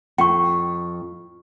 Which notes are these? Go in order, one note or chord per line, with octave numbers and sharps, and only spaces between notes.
F2 G5 C#6